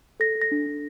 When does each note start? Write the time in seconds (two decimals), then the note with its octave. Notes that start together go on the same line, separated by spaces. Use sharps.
0.20 A4 A#6
0.35 A4
0.41 A#6
0.52 D4
0.66 D4